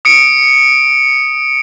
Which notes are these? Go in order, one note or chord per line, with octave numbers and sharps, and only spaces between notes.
D#6 C#7 D7